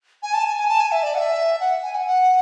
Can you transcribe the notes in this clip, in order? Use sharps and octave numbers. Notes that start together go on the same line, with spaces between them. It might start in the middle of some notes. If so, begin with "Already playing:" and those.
G#5
A5
G#5
G#5
A5
G#5
E5
D5
F#5
E5
F#5
G#5
F#5
F#5